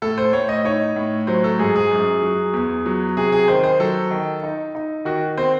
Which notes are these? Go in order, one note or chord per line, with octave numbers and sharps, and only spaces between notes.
A2 A4
C5
A2 C#5
D#5
D#4 C#5
A2
F#3 C5
A4
G#2 G#4
G#4
F#2
F#3
E2
F#3
C3 G#4
G#4
D#3 C5
C5
F#3 A4
D#3
D#4
D#4
D#3 F#4
C4 C5